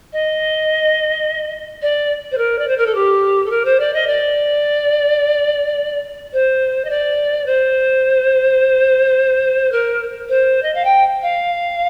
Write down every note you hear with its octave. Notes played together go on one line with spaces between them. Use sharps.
D#5
D5
C5
A#4
D5
C5
A#4
A4
G4
A4
A#4
C5
D5
D#5
D5
C5
D#5
D5
C5
A#4
C5
D#5
F5
G5
F5